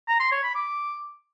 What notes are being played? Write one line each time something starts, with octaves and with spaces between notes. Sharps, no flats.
A#5
C6
C#5
B5
D6